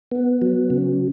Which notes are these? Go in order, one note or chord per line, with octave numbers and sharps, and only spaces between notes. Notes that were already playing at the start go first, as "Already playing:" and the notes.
B3
F#3
C#3